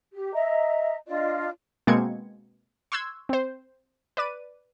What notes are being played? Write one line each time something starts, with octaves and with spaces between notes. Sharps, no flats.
G4
D#5 E5 A#5
D4 F4 D5 D#5
B2 G#3 A#3 C4 G#6 C#7
C6 C#6 E6 F#6 G#6
C4 C5
B4 D5 D6 D#7